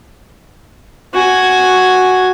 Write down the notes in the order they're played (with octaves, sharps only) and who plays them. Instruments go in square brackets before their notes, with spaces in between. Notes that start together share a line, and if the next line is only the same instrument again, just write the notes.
[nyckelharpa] F#4 G#5